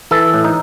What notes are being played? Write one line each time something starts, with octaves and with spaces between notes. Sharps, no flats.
E3 A4
A2
D#4